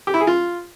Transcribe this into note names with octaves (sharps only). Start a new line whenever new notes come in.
G4
E4
G#4
F4